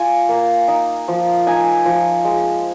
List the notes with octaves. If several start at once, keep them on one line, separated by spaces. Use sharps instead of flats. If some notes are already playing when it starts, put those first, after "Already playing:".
Already playing: F4 G#5
A#3
D#4
F3
D#4 G#5
F3
G#3